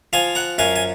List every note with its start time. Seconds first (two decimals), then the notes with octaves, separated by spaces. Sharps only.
0.13 F3 F5 G#5
0.35 F#5 A#5
0.58 F#2 F5 G#5
0.76 G#5